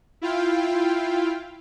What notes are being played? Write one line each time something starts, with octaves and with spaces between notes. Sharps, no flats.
E4 F4 F5 G5